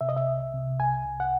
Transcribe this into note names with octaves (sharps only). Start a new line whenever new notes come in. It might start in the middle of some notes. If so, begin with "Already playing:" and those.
C3 E5
D#5
E5
C2
C3
C2 G#5
C2
F#5